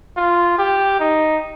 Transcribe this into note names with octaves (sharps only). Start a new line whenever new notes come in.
F4
G4
D#4